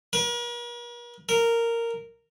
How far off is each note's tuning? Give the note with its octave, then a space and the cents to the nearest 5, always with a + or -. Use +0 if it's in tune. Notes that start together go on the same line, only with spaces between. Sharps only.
A#4 +45
A#4 -10